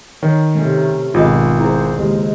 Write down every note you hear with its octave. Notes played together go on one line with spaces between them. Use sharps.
D#3 C#5
C3 A3 C#4
G#1 B2 F4 G#4 D#5
E4 G#4 C5
D#2 C#3 G#3